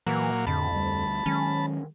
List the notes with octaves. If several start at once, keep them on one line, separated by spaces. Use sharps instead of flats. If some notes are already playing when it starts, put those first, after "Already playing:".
A#2 E3 F#3 A#3
F2 A2 D3 A5 B5
D2 G3
D#3 F#3 G#3 C#4